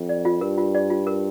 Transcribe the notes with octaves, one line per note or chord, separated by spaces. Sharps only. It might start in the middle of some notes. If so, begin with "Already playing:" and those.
Already playing: F2
D5
F4
G2 A#4
F4
D5
F4
A#4